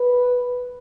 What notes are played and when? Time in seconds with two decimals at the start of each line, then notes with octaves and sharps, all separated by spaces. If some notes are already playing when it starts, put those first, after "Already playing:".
Already playing: B4